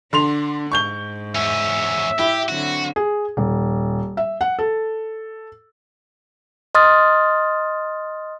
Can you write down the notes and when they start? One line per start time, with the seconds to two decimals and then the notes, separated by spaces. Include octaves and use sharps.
0.13 D3 D4 C6 F7
0.72 G#2 C#6 G6 G7
1.35 E2 C#4 E5
2.19 E4 G4
2.49 D3 F#3 C4 F#4
2.96 G#4
3.37 D#1
4.17 E5
4.41 F#5
4.59 A4
6.75 D#5 C6 D#6 F6 A6